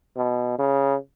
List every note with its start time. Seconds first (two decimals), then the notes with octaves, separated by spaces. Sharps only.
0.17 B2
0.59 C#3